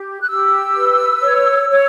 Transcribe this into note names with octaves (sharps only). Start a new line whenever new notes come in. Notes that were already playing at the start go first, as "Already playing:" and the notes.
Already playing: G4
F#6
G4 E6
B4
C#5
C#5